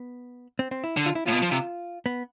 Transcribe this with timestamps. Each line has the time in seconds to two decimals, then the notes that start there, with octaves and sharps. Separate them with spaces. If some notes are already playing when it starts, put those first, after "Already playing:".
Already playing: B3
0.59 C4
0.71 C4
0.84 E4
0.97 D3
1.06 F4
1.15 E4
1.26 A2 F4
1.32 B2
1.42 F3
1.51 C3
2.06 B3